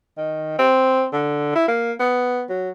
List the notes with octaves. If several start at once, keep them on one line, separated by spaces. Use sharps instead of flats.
D#3
C4
D3
E4
A#3
B3
F#3